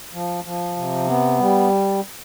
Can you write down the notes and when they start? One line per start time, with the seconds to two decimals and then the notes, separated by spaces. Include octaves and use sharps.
0.13 F3
0.44 F3
0.77 C3
1.07 B3
1.39 G3